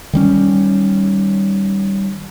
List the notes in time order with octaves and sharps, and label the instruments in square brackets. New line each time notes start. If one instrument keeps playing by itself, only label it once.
[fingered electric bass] D#3 G3 C#4